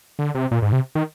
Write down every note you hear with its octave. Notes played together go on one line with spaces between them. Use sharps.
D3
C3
A#2
G#2
C3
D#3